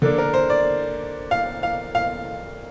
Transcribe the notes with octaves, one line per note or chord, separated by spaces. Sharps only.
D3 A#3 D4
A#4
C5
D5
F5
F5
F5